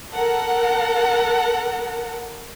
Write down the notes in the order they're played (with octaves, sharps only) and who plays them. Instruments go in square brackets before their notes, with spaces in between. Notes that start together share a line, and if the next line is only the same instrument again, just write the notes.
[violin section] A4 A#4 F#5